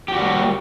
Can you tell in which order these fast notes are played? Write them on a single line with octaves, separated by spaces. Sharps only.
G4 F#4 G3 A#3